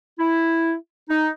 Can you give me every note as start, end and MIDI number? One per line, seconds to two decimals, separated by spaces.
0.19 0.74 64
1.09 1.29 63